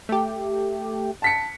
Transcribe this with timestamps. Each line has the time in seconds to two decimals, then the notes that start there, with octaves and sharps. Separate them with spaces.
0.09 A3 G4
1.22 A5 B6 C#7